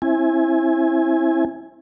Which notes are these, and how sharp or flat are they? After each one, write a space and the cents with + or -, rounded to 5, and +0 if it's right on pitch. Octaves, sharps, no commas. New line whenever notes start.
C4 +40 E4 +0 G#5 +0